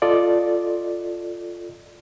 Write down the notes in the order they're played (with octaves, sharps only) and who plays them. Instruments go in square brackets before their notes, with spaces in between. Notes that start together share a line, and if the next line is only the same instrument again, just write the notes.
[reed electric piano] F4 A4 D5 D#5